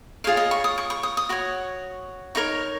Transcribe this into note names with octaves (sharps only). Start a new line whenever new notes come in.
F4 G#4 C#5 F5
D#5
C#6
D#6
C#6
C#6
D#6
D#6
F#4 C#5 C#6
D#4 A#4 C#5 C#6